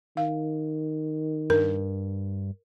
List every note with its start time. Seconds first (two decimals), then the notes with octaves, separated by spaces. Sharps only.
0.17 D#3 F5
1.50 G2 A#4